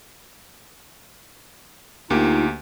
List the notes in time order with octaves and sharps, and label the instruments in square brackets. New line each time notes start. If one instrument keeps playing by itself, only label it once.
[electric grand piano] D2 A#3 G4 [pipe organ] D#4 F4